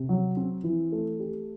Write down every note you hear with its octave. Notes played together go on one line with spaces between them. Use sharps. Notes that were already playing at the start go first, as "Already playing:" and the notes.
Already playing: C3
F#3
C4
E3
A3
G4